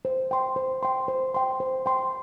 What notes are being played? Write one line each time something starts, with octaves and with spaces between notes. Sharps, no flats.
C5
G5 C6
C5
G5 C6
C5
G5 C6
C5
G5 C6